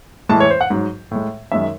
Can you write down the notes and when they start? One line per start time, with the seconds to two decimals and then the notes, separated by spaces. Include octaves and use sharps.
0.29 A2 E3 G#3 A5
0.40 C#5
0.50 C5
0.61 F#5
0.70 G#2 F#3
1.11 A2 G#3
1.52 F#2 D#3 G#3 E5